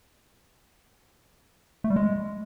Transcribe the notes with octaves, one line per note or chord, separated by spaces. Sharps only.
A3
G3
G#3